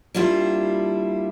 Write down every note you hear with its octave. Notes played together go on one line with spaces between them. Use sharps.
G3 A#3 D4 E4 F4 G4